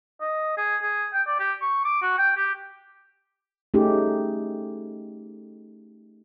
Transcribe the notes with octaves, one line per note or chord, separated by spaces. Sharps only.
D#5
G#4
G#4
G5
D5
G4
C#6
D6
F#4
G5
G4
A3 C#4 D#4 G4 G#4